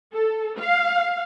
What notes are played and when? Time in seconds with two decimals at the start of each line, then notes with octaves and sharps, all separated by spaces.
0.13 A4
0.59 F5